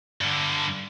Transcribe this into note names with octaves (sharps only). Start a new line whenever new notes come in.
G2 D3